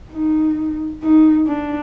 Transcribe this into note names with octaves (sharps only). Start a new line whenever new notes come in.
D#4
D#4
D4